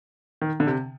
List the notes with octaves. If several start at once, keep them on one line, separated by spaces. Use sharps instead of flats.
D#3
D3
C3